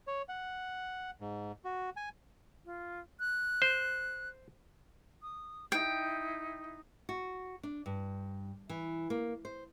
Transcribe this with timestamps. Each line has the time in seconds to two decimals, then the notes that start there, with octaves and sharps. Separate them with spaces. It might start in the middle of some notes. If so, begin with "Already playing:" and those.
0.07 C#5
0.29 F#5
1.21 G#2
1.65 F#4
1.97 G#5
2.65 F4
3.20 F#6
3.62 C5
5.22 D#6
5.72 D#4 E4 G5
7.09 F#4
7.63 D4
7.86 G2
8.69 E3
9.10 A#3
9.45 C5